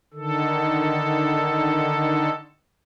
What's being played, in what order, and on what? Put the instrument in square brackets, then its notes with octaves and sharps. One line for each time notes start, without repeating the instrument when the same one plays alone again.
[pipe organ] D3 D#3 A4